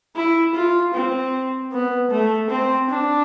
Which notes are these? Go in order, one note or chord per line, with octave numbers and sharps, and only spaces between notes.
E4
F4
C4
B3
A3
C4
D4